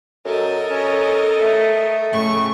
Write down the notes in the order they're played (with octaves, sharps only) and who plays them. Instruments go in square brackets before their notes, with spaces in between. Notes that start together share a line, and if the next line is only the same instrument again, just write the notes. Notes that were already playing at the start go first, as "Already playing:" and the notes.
[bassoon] F#2 [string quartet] A4 A#4 D#5
[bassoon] C#4
A3
[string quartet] A2 C#3 C#6